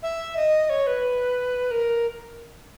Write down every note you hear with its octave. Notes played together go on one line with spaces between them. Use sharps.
E5
D#5
C#5
B4
A#4